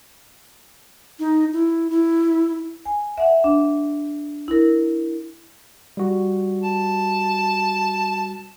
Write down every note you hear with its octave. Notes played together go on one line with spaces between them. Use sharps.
D#4
E4
E4
G#5
E5 F#5
D4
E4 A#4
G3 F#4
A5